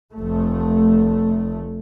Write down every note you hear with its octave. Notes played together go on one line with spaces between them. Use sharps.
F1 A3